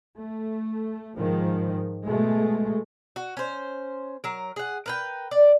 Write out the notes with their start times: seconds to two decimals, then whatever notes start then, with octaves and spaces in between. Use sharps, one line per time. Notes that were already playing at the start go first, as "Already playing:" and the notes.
0.18 A3
1.17 G#2 D#3 F3
2.04 B2 G#3 A3
3.16 F#4
3.37 C#4 C5
4.24 F#3 A#4
4.56 G#4 F#5
4.86 A#4 B4 G5
5.31 D5